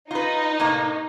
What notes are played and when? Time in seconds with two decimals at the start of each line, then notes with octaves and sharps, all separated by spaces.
0.11 D#4 F4 B4
0.60 A2 C3 A#3